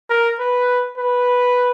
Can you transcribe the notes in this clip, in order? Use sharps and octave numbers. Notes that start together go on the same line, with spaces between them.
A#4
B4
B4